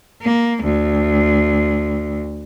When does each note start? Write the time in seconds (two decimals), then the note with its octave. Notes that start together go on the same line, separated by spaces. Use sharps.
0.22 A#3
0.64 D2